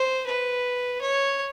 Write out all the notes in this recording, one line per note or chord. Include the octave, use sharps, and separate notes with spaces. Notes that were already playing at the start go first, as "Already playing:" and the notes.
Already playing: C5
B4
C#5